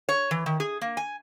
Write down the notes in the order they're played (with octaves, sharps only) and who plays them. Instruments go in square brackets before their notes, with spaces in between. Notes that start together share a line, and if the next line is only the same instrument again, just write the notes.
[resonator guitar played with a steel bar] C#5
E3
D#3
G#4
A#3
G#5